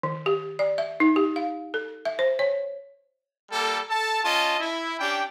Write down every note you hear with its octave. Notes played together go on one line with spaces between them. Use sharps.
D#3
G4
D5
E5
D#4
G4
F5
A4
E5
C5
C#5
G3 A#3 A4
A4 A5
C#4 F4 D#5 A5
E4
C#4 D4 G4 G5